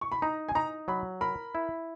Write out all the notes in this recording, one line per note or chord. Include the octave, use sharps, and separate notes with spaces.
C#6
B5
D#4 A#5
G#5
D#4 A#5
F#3 B5
A#4 B5
E4